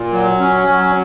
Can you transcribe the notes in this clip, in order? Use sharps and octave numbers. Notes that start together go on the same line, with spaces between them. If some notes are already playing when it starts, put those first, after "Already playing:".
Already playing: A#2
F#3
C#4
F#3